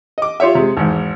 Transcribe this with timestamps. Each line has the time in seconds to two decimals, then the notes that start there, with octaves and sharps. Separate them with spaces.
0.18 D#5 D6
0.40 F4 G4 C#5 E5
0.55 C3 G#3
0.77 G#1 E2 G#2